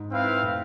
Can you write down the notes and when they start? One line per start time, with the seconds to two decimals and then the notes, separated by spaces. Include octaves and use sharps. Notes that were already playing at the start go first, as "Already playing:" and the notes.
Already playing: G#2
0.11 C4 E4 B4 F5
0.43 A2